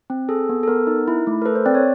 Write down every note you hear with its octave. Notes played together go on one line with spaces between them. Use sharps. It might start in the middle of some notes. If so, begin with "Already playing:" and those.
C4
G#4 A4
B3
A4
B3 A#4
D#4
E4
A3
A#4
A4 B4
C5
C4 D5
C#5